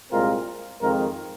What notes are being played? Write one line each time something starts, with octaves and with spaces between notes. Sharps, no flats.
C2 A#2 G#3 C4 F4 A#4
F2 D#3 G#3 C4 F4 A#4